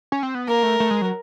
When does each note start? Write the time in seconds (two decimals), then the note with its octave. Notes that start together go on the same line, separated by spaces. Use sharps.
0.12 C#4
0.23 C4
0.35 B3
0.47 A#3 A#4
0.63 A3
0.80 A3
0.91 G#3
1.02 F#3